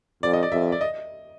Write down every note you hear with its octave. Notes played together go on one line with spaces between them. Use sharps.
F2 D5
D#5
D5
F2 E5
D5
D#5